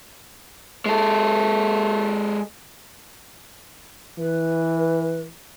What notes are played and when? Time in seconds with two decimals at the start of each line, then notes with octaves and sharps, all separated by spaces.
0.86 G#3 A4
4.19 E3 B4